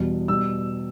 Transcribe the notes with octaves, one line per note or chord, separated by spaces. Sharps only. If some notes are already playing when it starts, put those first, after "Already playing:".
Already playing: E2 B2 G3
B2 G3 E6